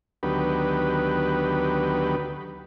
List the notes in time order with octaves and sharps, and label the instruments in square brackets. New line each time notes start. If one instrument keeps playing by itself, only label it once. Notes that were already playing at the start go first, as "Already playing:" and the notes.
[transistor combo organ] D2 D#3 F#3 B3 G4 B4